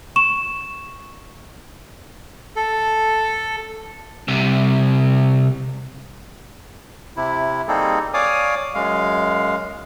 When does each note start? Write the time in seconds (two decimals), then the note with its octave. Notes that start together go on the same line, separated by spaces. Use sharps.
0.16 C#6 E7
2.56 A4
4.28 C2 C3
7.17 C3 E4
7.68 G3 A#3 C4 D#4 G#4 A4
8.14 C#5 D5 F5 G#5 D6 D#6
8.75 F#2 G#3 F5